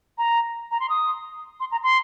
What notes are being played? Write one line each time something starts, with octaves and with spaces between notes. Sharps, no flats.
A#5
A#5
C6
D#6
C6
A#5
C6